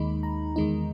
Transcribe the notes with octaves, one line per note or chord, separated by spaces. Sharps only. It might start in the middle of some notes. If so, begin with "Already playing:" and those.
Already playing: D#2 D#3 G#3 D#4 B5
A#5
E2 D#3 G#3 D#4